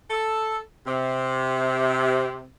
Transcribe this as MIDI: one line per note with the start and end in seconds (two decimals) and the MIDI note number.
0.10 0.60 69
0.87 2.47 48